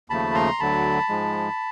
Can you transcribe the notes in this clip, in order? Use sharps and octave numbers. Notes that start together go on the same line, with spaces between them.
D#2 C#3 F3 A3 A5 B5
A#5 C6
D2 D3 F#3 A5 B5
G#2 F3 G#3